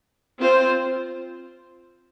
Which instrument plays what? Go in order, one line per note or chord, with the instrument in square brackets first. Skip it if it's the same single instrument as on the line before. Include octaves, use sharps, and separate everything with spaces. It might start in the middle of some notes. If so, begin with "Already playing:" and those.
[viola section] C4 F4 C5